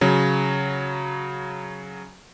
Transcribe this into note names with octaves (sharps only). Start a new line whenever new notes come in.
C#3 F#3